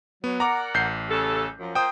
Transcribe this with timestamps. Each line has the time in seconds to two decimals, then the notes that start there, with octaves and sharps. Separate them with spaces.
0.24 F#3 B3
0.40 A#4 D5 F#5 A#5 D6
0.74 A1 G6 C7
1.09 C#3 G4 A4
1.59 F#2 F3
1.75 A#3 F4 C5 G5 D#6